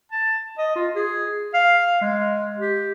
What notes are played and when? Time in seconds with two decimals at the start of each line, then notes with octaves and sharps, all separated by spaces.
0.12 A5
0.58 D#5
0.76 F4
0.95 G#4
1.54 F5
2.02 G#3
2.58 G4